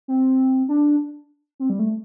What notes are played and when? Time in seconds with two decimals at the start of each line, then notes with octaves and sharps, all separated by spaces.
0.08 C4
0.69 D4
1.60 C4
1.70 G3
1.79 A3